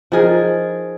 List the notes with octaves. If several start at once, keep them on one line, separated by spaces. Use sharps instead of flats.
F3 D#4 G#4 A#4